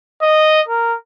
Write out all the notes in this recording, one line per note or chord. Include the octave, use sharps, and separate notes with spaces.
D#5
A#4